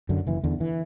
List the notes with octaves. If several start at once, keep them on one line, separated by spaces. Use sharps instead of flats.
F#2 D3
F#1 E3
E2 D3
E3